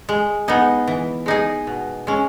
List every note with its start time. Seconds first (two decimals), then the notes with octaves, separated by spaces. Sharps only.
0.09 G#3
0.48 B3 D#4 G#4
0.88 E3
1.26 G#3 D#4 G#4
1.67 B2
2.07 G#3 C#4